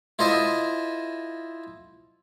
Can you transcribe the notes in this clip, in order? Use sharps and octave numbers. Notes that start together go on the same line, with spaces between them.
E4 F4 A4 C5 D#5 E5